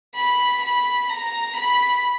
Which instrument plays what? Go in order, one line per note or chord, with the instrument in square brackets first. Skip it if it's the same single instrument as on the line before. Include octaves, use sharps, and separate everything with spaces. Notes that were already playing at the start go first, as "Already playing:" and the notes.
[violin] B5
B5
A#5
B5